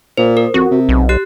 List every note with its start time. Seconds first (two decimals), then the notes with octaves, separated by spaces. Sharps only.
0.17 A#2 C5
0.37 A#4
0.54 F2 F#4
0.71 C3
0.89 B1
1.09 G4 F#6